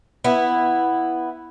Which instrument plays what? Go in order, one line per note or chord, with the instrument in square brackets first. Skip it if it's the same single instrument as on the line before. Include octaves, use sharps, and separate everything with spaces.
[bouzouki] B3 E4